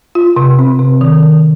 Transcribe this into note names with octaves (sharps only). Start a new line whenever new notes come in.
F4
C3
C4
C3
D#3
D#3